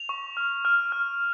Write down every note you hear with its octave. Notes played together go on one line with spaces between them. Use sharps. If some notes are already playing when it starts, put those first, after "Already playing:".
Already playing: F7
C#6
F6
F6
F6